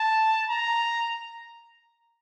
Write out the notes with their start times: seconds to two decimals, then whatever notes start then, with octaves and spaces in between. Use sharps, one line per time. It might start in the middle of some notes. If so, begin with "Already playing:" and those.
Already playing: A5
0.49 A#5